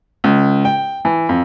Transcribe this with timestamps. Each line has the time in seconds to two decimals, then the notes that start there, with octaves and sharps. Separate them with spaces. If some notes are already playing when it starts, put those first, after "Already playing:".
0.24 C#2
0.65 G5
1.05 E3
1.29 F2